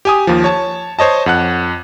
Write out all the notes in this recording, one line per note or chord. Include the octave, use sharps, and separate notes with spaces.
G4 G#5 D#6
D#2 F3
C#5 A5
C5 C#5 D#5 A5
F2 F#5 F#6